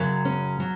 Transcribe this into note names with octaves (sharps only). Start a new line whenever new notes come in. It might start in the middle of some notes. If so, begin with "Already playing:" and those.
Already playing: F#2 C#3 F#3
C#4
F#3